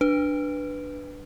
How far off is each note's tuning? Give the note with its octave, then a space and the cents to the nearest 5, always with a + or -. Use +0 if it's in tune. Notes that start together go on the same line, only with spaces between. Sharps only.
D4 +5 B4 +0